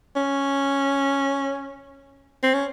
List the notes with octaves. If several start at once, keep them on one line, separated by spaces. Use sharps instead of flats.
C#4
C4
C#4